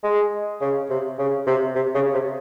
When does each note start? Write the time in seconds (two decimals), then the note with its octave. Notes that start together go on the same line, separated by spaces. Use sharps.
0.04 G#3
0.61 C#3
0.90 C3
1.19 C#3
1.47 C3
1.76 C3
1.95 C#3
2.14 C3